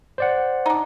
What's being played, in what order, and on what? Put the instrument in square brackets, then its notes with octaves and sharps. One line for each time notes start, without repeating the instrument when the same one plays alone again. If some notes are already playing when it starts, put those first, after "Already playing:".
[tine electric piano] C5 D5 F#5
[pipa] D4 D#4